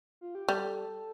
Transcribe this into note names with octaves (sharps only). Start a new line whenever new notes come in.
F4
G4
G3 A4